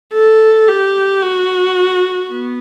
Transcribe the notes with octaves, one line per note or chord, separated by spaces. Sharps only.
A4
G4
F#4
B3